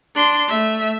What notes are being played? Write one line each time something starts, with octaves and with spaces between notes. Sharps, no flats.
D4 C6
A3 E5